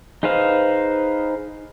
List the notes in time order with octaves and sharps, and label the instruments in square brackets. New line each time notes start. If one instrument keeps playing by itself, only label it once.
[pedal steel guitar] D#4 G#4 B4 C5 F5